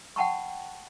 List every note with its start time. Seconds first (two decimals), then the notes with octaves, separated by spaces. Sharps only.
0.16 F#5 G5 A5 B5 C#6